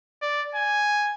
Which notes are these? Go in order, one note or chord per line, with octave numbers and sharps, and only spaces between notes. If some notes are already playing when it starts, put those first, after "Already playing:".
D5
G#5